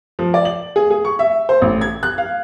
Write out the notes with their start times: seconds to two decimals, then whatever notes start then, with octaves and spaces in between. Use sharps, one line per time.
0.19 F3
0.34 D5
0.45 F#7
0.76 G#4
0.90 G#4
1.05 C#6
1.19 E5
1.49 C5
1.62 A1
1.81 G#6
2.03 F#6
2.18 F5